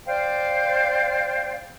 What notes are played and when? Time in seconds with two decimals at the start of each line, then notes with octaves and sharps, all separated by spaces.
0.06 C5 D5 F5 G5